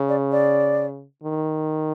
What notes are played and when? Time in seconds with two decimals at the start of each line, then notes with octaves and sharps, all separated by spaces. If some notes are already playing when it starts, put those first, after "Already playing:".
Already playing: C#3
0.09 D5
0.32 D5
1.23 D#3